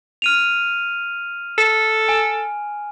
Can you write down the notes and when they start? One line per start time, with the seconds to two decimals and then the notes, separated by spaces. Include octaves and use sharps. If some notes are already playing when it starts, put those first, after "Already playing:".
0.22 F6 D#7 F7
1.58 A4
2.09 G#5